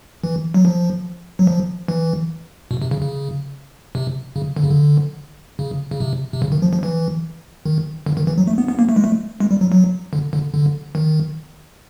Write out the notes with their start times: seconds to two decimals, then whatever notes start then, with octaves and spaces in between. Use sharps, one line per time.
0.24 E3
0.54 F#3
0.65 F3
1.39 F#3
1.47 F3
1.88 E3
2.71 B2
2.82 C3
2.91 C#3
3.02 C#3
3.95 C3
4.36 C#3
4.57 D3
4.63 C#3
4.70 D3
5.59 C#3
5.91 C#3
6.00 C3
6.33 C3
6.42 C#3
6.52 D#3
6.62 F3
6.73 F3
6.83 E3
7.66 D#3
8.06 D3
8.17 D#3
8.27 E3
8.38 F#3
8.47 A3
8.58 B3
8.68 B3
8.79 A#3
8.89 A3
8.96 G#3
9.04 A3
9.40 G#3
9.51 G3
9.61 F#3
9.72 F#3
10.13 D3
10.33 D3
10.54 D3
10.95 D#3